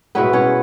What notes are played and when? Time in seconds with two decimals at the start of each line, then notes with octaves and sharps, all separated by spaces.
0.15 B2 G#3 B3 C#4 E4 B4
0.33 C#4 C#5